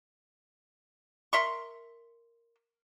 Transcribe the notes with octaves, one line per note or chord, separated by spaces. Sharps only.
A#4 E5 C6 C#6